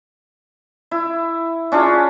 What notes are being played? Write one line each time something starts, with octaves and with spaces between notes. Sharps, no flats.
E4
C#4 D4 F4 G#4